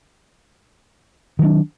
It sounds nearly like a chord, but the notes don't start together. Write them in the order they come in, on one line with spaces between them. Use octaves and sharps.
D#3 F#3 D4